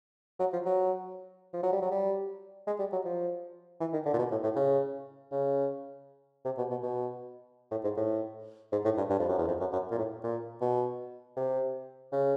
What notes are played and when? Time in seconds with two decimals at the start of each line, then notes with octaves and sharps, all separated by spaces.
0.40 F#3
0.53 F3
0.65 F#3
1.53 F3
1.63 F#3
1.72 G3
1.82 F#3
1.91 G3
2.67 G#3
2.79 G3
2.92 F#3
3.05 F3
3.80 E3
3.93 D#3
4.05 D3
4.13 A#2
4.19 B2
4.31 A2
4.43 A2
4.56 C#3
5.32 C#3
6.45 C3
6.58 B2
6.70 B2
6.83 B2
7.71 A2
7.84 G#2
7.97 A2
8.72 G#2
8.85 A2
8.98 G2
9.10 G2
9.19 F2
9.29 F#2
9.38 E2
9.48 F2
9.60 F#2
9.73 F#2
9.91 A#2
9.98 A2
10.24 A#2
10.61 B2
11.37 C3
12.12 C#3